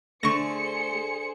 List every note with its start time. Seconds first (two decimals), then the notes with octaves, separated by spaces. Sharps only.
0.23 D3 A3 G#4 C5 C#6 A#6 C#7